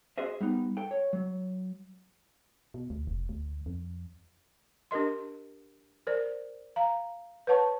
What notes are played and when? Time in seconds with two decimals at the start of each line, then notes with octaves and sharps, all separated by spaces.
0.18 F#4 G#4 C5 D#5 E5
0.40 G3 B3 D#4
0.77 A4 G5
0.91 C#5
1.13 F#3
2.74 B2
2.90 D2
3.07 F1
3.29 D2
3.66 F2
4.91 D4 G4 A#4 D#5 C6
6.07 A#4 C5 D5
6.76 F5 A#5
7.47 B4 C#5 F#5 A5 C#6